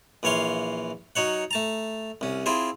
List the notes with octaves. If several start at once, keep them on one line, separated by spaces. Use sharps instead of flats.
A#1 E3 C#5 F5 C6
F#3 D#4 C#5 F#5
A3 A5 A#5
C2 C#4
C4 E4 F4 G#4 C5